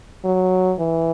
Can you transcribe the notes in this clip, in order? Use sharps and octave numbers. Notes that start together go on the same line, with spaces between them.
F#3
E3